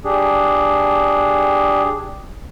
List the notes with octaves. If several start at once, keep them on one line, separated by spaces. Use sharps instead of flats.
D4 G4 G#4